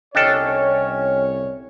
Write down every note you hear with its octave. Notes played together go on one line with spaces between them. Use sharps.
C2 C#4 D4 A4 C#5 D#5 G5 F6